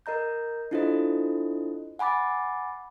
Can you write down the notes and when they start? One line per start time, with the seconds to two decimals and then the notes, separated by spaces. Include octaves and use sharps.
0.06 A#4 D#5 A#5 G6
0.71 D4 E4 F4 A4 C5 D#5
1.99 F#5 G#5 B5 D6 A6